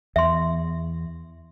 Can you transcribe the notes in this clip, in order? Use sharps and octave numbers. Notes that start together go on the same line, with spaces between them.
E2 E5 C6